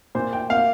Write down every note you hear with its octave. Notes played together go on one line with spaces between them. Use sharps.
A#2 C5
G5
A#3 F5